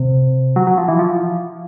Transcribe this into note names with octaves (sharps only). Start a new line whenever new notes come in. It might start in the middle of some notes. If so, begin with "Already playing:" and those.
Already playing: C3
F#3
F#3
F3
E3
F3